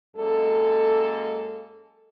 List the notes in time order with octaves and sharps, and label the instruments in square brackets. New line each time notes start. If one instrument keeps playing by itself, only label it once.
[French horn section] F#2 G#3 A#3 A4